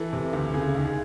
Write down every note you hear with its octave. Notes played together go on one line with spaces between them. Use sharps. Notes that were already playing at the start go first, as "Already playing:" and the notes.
Already playing: E3 A4
C3
D2
C#3 G#4
D#2
G#4